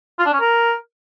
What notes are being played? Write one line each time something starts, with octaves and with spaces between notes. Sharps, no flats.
F4
D4
C#4
A#4